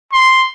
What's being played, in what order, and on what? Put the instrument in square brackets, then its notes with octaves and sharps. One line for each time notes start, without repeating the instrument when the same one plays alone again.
[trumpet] C6